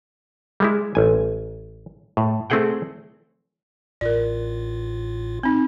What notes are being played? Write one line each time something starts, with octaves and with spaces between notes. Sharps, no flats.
G3 G#3 E4
A1 G#5
A2
A3 C4 E4 G#4 F#5 G5
A1 A2 F4 A#4 D5
C4 D#4